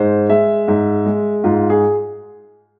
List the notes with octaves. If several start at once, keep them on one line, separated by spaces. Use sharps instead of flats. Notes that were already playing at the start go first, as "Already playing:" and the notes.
Already playing: G#2 C5
G#3 E5
G#2
G#3
G#2 F4
G#4